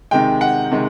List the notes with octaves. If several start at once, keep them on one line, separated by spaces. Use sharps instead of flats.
C3 D#3 G#3 G5
F#5
C3 D#3 G#3